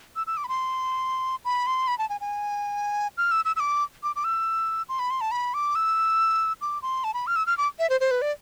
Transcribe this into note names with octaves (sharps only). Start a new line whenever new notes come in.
E6
E6
D6
B5
C6
B5
C6
B5
A5
G#5
G#5
F6
E6
E6
E6
D6
D6
D6
E6
C6
B5
C6
A5
B5
D6
E6
D6
C6
A5
B5
F6
E6
F6
D6
E5
C5
C5
B4
D5